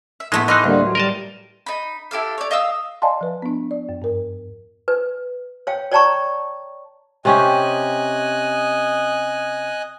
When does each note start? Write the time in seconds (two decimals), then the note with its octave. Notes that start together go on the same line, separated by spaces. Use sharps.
0.20 E5
0.32 A2 G#3 A3 B3 C5 B5
0.48 E3 D#4 D#5 C6 F6 F#6
0.64 D2 D3 G3 A#3
0.81 F#3
0.95 G3 A#4 D#5 A5
1.66 D#4 B5
2.11 E4 G4 A4 F5
2.38 C#5 D5
2.51 D#5 F5 D#6 E6
3.02 D5 D#5 F5 G#5 A5 C6
3.21 F3 B4
3.42 B3 D4
3.71 D5
3.89 F#2
4.02 G2 A#4
4.88 B4
5.67 C#5 F5 G5
5.92 C#5 D5 G5 A5 A#5 C#6
7.25 C3 C#4 G4 D#5 G#5 F#6